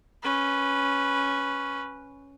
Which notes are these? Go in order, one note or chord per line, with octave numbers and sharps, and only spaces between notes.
C#4 B4